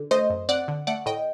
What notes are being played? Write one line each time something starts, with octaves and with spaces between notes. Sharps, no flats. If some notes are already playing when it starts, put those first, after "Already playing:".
Already playing: D3
A3 C5 D#5
F#2
C4 D5 F#5
D3
A3 D5 F#5
A2 D#5 G5